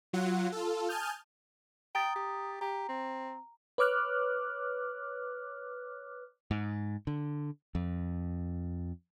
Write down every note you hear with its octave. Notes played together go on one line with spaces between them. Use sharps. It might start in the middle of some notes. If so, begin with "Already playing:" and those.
F#3 F4 F#5
F4 A4
G#5 A5 D#6 F6 G6
G5 A#5 D#6 A6
G4
G4 A#5
C4
B4 C#5 D6 F6 F#6
G#2
D3
F2